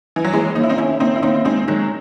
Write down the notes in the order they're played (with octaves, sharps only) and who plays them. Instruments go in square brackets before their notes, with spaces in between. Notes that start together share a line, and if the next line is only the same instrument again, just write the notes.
[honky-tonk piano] E3
F#3
[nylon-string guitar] D#2 [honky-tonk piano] E3 G#3
[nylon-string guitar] D#2 [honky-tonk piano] D#4
[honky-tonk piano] E4
C4 D#4
[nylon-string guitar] D#2 [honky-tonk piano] C#4 E4
[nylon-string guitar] D#2 [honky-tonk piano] C4 D#4
[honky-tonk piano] E4
[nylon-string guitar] D#2 [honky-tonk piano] C4 D#4
[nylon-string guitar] G#3 [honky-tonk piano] C4 D#4
[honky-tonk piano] D#3 F#3 [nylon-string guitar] G#3